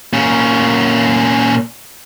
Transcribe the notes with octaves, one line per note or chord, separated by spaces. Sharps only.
A#2 C#4